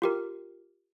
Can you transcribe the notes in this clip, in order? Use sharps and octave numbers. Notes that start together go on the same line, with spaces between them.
F4 G4 A#4